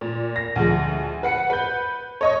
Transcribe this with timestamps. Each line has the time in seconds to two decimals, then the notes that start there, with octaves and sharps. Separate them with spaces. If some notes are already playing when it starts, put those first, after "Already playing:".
0.01 A#2
0.36 A#6
0.56 D2 F3 G#3
1.23 B4 F#5 C#7
1.50 B4 G6
2.21 C#5 D#5 C#6